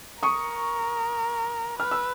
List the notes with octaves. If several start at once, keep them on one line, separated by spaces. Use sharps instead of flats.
A#4 C#6 D#6
B4 F6
E6